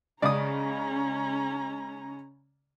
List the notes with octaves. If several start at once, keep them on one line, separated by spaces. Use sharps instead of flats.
C#3 G#3 C#4 D5 A#5 D#6